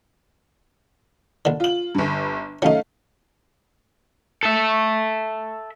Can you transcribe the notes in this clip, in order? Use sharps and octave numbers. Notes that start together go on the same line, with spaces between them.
A#1 D3
F4 F#7
G1 G2
F#3 A3 C#4 D#4 F5
A4 E5